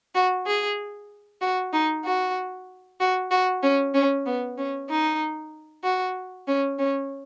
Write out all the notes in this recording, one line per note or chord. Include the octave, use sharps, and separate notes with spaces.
F#4
G#4
F#4
D#4
F#4
F#4
F#4
C#4
C#4
B3
C#4
D#4
F#4
C#4
C#4